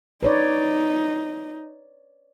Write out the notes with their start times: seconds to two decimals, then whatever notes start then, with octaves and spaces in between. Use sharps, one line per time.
0.23 D#4 B4 C#5 D5